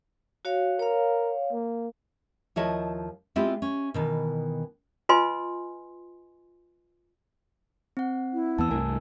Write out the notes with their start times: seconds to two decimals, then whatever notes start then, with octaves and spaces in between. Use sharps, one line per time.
0.45 F#4 C#5 F5
0.79 A#4 C#5 F5
1.52 A#3
2.56 D#2 F3 E4 C#5 D#5 A5
3.36 G#3 B3 C4 E4 F4 G4
3.62 C#4
3.94 B2 D#3 E3
5.09 F4 B4 D#5 G#5 C6
7.97 C4 F#5
8.33 E4
8.59 E2 E3 B3 A5 E6
8.71 C2 G2 A3 A#4 G#5